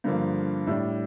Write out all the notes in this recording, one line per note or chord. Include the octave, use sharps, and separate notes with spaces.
G2 D3 F3 A#3
A2 G3 D4